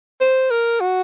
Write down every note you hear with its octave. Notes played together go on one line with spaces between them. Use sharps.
C5
A#4
F#4